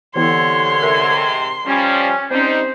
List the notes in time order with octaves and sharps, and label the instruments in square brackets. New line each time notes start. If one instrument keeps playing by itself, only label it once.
[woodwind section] C2 D3 C#5 [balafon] E3 B3 E4 [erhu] C6
[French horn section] G#2 C3 [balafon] A4 A#4 E5
[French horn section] F3 G3 [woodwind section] C#4
[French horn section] G3 D#4 [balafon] C4 C#4 [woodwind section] C5